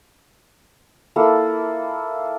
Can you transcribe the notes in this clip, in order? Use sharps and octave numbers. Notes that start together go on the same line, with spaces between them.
A#3 E4 A4